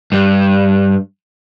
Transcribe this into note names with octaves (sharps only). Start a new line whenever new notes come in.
G2